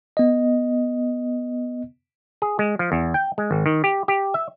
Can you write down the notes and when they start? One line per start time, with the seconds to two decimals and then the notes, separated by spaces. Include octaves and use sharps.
0.17 B3 D#5
2.42 G#4
2.59 G#3
2.79 F3
2.92 E2
3.14 G5
3.38 G#3
3.51 G#1
3.66 D#3
3.84 G4
4.08 G4
4.34 E5